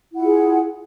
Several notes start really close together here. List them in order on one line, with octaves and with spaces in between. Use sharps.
E4 F#5 F4 G#4